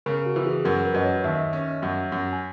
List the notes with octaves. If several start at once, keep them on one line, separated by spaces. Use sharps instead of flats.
C#3 A#4
F#4
E3
G#4
F#2 A#4
B4
F#2 D#5
C#5
D#2 E5
D#5
E5
C#4
F#2
F#2
G#5